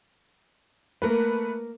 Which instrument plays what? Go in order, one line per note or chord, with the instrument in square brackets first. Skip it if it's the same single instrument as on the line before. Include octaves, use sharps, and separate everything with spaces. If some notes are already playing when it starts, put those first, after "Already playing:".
[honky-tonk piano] A3 B4 [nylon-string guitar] A#3 A#4